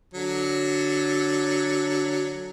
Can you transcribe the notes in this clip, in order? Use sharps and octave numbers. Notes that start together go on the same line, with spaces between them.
D3 F#3